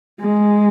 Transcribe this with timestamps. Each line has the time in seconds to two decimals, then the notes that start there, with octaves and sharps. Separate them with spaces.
0.20 G#3